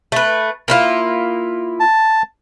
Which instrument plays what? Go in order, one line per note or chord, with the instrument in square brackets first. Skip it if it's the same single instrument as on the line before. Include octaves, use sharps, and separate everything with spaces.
[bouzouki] A3 B4
A#3 E4 F4
[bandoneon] A5